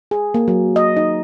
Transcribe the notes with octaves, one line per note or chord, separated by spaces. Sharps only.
G#4
A#3
F#3
D#5
D#4